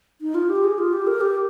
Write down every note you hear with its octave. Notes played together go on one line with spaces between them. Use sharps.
D#4
F4
G4
G#4
F4
G4
A#4
G4